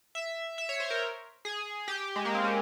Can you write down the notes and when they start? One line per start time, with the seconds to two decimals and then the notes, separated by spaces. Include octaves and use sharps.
0.15 E5
0.58 E5
0.69 C#5
0.80 C5
0.90 A#4
1.45 G#4
1.88 G4
2.16 G#3
2.25 A#3
2.34 C4
2.44 C#4